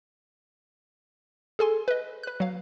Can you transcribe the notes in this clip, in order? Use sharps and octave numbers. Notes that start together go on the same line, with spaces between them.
G#4 A4 G#5 C6
B4 D#5
B4 F#6
F#3 F5